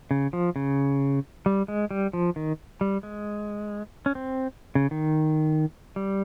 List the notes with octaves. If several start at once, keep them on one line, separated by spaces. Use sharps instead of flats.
C#3
F3
C#3
G3
G#3
G3
F3
D#3
G3
G#3
C#4
C4
C#3
D#3
G3